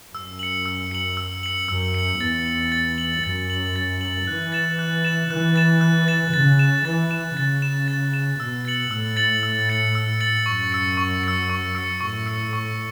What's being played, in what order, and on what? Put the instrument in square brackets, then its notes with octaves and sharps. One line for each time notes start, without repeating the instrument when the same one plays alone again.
[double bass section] F#2 [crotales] E6
[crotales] C#7 F#7
E6
C#7 F#7
E6
C#7 F#7
[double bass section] F#2 [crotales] E6
[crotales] C#7 F#7
[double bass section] E2 [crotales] A6
[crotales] F#7
A6
F#7
[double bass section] F#2 [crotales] A6
[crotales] F#7
A6
F#7
[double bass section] E3 [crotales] F#6
[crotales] A6 E7
F#6
A6 E7
[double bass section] E3 [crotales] F#6
[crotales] A6 E7
F#6
A6 E7
[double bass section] C#3 [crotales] A6
[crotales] E7
[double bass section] E3 [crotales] A6
[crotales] E7
[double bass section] C#3 [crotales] A6
[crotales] E7
A6
E7
[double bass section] B2 [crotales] E6
[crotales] A6 C#7 F#7
[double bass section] A2 [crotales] E6
[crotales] A6 C#7 F#7
E6
A6 C#7 F#7
E6
A6 C#7 F#7
[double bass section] F#2 [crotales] C#6
[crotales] E6 C#7
C#6
E6 C#7
C#6
E6 C#7
[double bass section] A2 [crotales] C#6
[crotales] E6 C#7
C#6